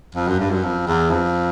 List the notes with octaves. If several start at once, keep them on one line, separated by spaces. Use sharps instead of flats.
F2
F#2
G2
F#2
F2
E2
F2